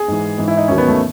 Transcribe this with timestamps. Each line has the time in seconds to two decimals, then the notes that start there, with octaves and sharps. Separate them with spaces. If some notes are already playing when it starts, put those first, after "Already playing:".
Already playing: G#4
0.08 G#2 E3
0.38 G#2 E3
0.48 E4
0.57 D#4
0.68 D#2 D#3 F#3 C#4
0.78 B3
0.88 A3